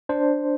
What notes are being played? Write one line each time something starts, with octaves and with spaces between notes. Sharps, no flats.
D4 C5